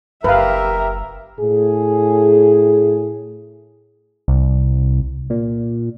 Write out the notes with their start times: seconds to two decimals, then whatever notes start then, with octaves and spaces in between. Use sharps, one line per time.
0.24 F#1 G4 A#4 B4 E5 F5
1.40 A2 G#4
4.28 C2
5.30 A#2